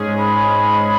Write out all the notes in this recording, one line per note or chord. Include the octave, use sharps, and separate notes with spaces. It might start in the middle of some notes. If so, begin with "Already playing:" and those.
Already playing: G#2 G#3 C#4 G#4
B5